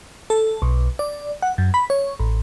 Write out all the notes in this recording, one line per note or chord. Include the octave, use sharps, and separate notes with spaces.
A4
B1
D5
F#5
F#2
B5
C#5
A1